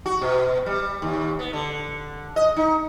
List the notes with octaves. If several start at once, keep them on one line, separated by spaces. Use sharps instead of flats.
F#4
B2
G3
D#2
B3
D3
D#5
D#4